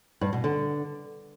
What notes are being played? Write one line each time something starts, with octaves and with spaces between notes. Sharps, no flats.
G2
B2
D3